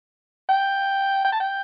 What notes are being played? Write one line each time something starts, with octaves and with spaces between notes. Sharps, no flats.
G5
G5
A5
G5